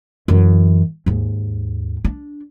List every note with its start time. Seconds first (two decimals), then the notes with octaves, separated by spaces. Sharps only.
0.28 F#2 E3
1.06 D#2 G#2
2.05 D4